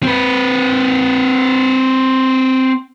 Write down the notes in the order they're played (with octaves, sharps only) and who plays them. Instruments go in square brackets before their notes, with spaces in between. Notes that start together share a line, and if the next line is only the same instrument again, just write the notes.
[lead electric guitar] C4 B4